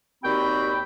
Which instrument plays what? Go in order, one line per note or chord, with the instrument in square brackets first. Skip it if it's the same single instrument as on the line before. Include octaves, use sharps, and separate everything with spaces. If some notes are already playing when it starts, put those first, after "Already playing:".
[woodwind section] D#2 G3 C4 F#4 G5 B5